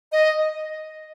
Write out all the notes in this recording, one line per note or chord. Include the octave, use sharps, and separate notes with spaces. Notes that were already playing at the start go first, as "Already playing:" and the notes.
D#5